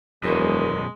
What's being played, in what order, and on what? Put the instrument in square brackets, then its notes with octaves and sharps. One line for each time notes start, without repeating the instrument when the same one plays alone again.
[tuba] E1 [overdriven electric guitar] F#2 B2 [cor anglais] G#3 [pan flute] A#4